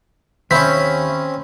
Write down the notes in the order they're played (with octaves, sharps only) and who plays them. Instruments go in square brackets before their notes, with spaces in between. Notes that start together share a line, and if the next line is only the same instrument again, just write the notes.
[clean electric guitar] D#2 E5 [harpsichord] C4 C#4 [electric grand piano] B5 G6 B6